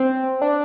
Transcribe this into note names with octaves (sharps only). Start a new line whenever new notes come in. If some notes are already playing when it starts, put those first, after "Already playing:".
Already playing: C4
D4